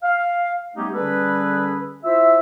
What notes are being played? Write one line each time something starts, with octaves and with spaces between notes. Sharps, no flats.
F5
G3 A3 B3 C#4 D#4 G4
D3 G3 C#4 G#4 A4 B4
E4 F4 C5 E5